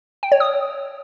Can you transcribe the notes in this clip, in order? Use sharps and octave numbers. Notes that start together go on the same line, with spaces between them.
G5
C#5
D#6